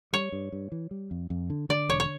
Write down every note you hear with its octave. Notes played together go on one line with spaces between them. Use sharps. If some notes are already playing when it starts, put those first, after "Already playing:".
G3 C#5
G2
G2
E3
G3
F2
F2
D3
D3 D5
E1 C#5
C#5